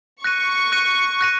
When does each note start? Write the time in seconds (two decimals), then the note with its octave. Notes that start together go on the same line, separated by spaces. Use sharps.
0.24 C#6 F#6 A#6 D#7
0.72 F#6 A#6 D#7
1.21 F#6 A#6 D#7